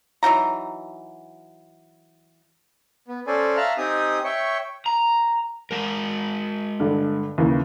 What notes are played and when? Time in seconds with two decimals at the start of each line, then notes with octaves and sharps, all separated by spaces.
0.23 E3 F#3 D#4 A#5
3.08 B3
3.27 C#4 A4 C5 D5 G#5
3.57 E5 F5 A5 A#5 F6 F#6
3.78 C4 D#4 G4 G#5 D#6
4.24 C#5 E5 G5 C#6
4.86 A#5
5.71 G#3 A#4
6.80 G2 D3
7.38 D#2 C#3 E3